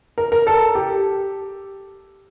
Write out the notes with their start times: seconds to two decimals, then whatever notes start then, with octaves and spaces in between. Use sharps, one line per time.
0.18 A#4
0.32 A#4
0.47 A4
0.75 G4